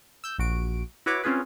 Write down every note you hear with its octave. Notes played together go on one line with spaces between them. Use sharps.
E6 G6
A#1 F#4 D7
E4 F#4 B4 C#5 D6
C4 C#4 F4 G#4 B4